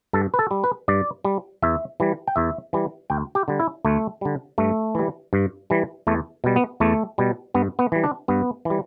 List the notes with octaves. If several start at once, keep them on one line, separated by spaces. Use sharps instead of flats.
G2 A4
B4
A4
G3
B4
G2 D5
G3
E2 E5
E3 G3
G5
E2 E5
E3 G3
D2 G5
G4
D3 G3
E4
D2 A3
D3 G3
G2 A3
E3 G3
G2
E3 G3
E2 A3
B2 G3
B3
E2 A3
B2 G3
G2 B3
B3
E3 G3
D4
G2 B3
E3
G3